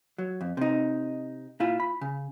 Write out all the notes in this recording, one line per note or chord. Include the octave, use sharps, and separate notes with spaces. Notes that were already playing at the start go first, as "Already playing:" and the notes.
F#3
F2
C3 D#4
A#2 E4 F4
B5
C#3